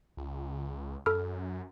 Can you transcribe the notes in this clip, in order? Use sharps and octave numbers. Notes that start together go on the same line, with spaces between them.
C#2
F#2 A4 B5 F6